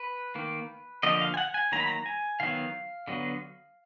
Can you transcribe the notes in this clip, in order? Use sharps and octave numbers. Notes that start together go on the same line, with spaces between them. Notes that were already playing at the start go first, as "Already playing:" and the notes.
Already playing: B4
D#3 A#3
D3 F3 A#3 D#5
F5
G#5
F#5
G#5
D#3 F#3 A#3 A#5
B5
A#5
G#5
D#3 F#3 B3 F5
D3 F#3 B3